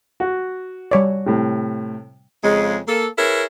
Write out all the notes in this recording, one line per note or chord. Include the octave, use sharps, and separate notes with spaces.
F#4
G3 C#5 D5
A2 C3
F2 C#3 G#3
A#3 A4
E4 G#4 A#4 B4 C#5